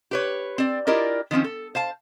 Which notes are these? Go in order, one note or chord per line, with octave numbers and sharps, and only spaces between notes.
G4 B4 C#5
C4 D5
E4 F4 G4 A#4 D5 D#5
D#3 F3 C4 C#4
A4
C5 F5 A5